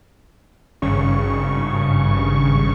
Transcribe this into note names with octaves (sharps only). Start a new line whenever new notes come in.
G#1 G2 C#3 C#6